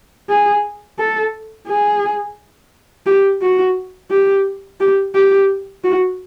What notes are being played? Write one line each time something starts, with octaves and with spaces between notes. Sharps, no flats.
G#4
A4
G#4
G4
F#4
G4
G4
G4
F#4